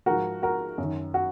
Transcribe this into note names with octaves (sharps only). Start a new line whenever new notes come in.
G#2 F3 F#4 A#4
F#4 A#4
F#2
D#3
F#4